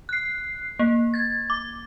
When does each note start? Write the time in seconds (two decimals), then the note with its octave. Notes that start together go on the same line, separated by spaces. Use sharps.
0.09 F#6 C7
0.79 A#3
1.14 G#6 A6
1.50 D6